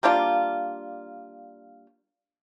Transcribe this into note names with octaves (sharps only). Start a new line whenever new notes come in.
G3 A#3 D4 F4